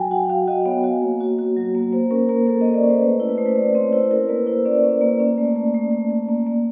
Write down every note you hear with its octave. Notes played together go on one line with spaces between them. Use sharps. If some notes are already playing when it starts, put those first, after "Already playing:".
Already playing: F#3 F#4 G5 G#5
F#4 F#5
F#4 F5
F#4 D#5
B3 C#5
F#4
A#3
F#4
F#4
F#3
A#3
A#3 C5
C#4 A#4
A#3 A#4
A#3 A4
A#3 D#5
D5
C#4 C5
A3 B4
E4
B4
A3 C5
B4
A3 D5
C4 C#5
E4 C5
E4 A#4
A#3 B4
E4 C5
C#4 D5
C#4
A#3
C#4
A3
A3
A3
A3
A3
A#3
A#3